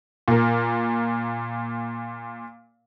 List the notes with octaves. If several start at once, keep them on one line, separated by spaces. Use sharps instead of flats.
A#2 A#4